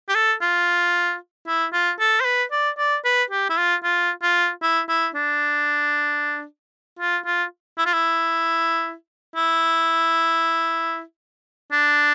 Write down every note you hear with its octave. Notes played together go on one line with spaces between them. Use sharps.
G4
A4
F4
E4
F4
A4
C5
B4
D5
D5
B4
G4
E4
F4
F4
F4
E4
E4
D4
F4
F4
E4
F4
E4
E4
D4